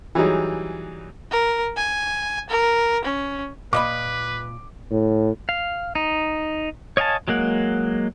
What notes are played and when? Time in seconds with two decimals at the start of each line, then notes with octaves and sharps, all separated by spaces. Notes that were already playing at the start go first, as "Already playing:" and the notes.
0.15 E3 F#3 G3 D#4 G#4
1.31 A#4
1.76 G#5
2.49 A#4
3.04 C#4
3.73 A#2 B4 D#5 B5 D6
4.91 A2
5.49 F5
5.95 D#4
6.97 C#5 D#5 F5 G#5 A5
7.28 F#3 G#3 A#3 F#5